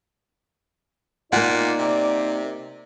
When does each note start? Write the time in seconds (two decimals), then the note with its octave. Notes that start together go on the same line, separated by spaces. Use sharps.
1.33 A#2 A#3 D#4 D5 F#5
1.79 C3